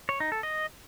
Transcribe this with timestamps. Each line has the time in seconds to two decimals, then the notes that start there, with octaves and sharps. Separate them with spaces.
0.09 C#5
0.20 D#4
0.32 A4
0.43 D#5